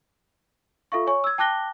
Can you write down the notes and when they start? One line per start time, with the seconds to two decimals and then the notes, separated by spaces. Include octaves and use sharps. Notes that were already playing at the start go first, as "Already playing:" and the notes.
0.92 F4 A4 E5 F5 C#6
1.07 C#5 G#5 C#6
1.24 E6 G#6
1.38 G5 A5 D6 F#6 A#6 G7